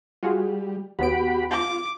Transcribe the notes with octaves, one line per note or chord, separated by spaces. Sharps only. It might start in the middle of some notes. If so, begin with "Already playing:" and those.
G3 F4 F#4 G#4
D#2 B3 F#4 G4 B5 D7
F4 D6